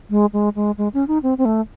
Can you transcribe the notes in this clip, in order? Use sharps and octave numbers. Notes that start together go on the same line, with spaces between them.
G#3
G#3
G#3
G#3
C#4
D#4
C4
C4
A3